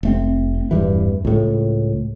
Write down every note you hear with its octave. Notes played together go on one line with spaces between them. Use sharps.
F1 A3 C4
D1 E2 G2 E3
C#2 A2